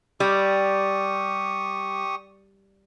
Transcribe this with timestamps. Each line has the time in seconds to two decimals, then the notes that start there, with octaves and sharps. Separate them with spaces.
0.20 G3 G4 C#6 D#6